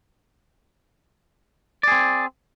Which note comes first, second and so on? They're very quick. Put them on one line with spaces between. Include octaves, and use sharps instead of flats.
D5 G#4 C4